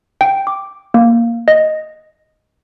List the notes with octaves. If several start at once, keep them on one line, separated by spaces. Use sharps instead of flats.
G5
D6
A#3
D#5